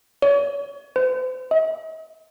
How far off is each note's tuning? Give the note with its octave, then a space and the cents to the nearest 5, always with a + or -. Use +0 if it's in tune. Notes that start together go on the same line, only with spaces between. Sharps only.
C#5 +35
C5 -40
D#5 +45